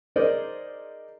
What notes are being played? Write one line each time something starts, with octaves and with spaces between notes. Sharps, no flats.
D#4 G#4 A#4 C5 D5 D#5